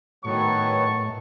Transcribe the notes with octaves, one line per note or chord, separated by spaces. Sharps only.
A2 D#3 F#3 B3 A5 C#6